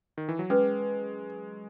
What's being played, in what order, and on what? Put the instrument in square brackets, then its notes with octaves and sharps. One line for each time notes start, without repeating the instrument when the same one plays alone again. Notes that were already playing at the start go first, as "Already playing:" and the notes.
[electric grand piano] D#3
E3
F#3
[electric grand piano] G#3 [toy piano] C#4 G#4 B4